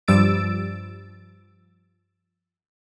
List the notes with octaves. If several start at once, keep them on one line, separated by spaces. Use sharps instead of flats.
G2 F3 G3 E6 A6 D7